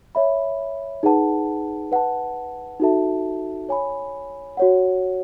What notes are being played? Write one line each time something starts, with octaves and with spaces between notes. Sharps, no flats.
C#5 E5 B5
D#4 G#4 B4 F#5 A5
B4 F#5 A5
D#4 F#4 A4 E5 A5
C#5 G#5 B5
F#4 C#5 F#5